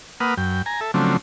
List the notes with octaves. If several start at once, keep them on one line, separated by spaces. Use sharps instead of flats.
A#3 B4 F#5 D#6 F6
F#2 G5
G#5 A#5
A4 E5
C#3 F3 F#3 A3 C4 D4